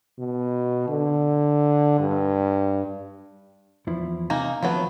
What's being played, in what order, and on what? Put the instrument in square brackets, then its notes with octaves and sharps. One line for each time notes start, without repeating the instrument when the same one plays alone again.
[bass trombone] B2
D3
G2
[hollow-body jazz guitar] E2 F3 E4
[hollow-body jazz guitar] C3 G#5 [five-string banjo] A#3 D#4
[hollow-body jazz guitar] D#2 F3 [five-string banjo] F#3 A3 B3